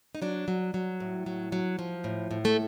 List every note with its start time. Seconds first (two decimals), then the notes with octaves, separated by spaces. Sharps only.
0.15 D#4
0.22 F#3 D4
0.48 F#3
0.74 F#3
1.00 A2
1.26 F#3
1.52 F#3
1.79 F3
2.04 A2
2.31 A2
2.45 A3